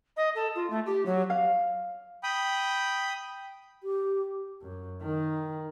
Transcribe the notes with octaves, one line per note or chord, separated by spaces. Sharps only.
D#5
A4
F4
A3
G4
F#3
F5
G5 B5 D#6
G4
F#2
D#3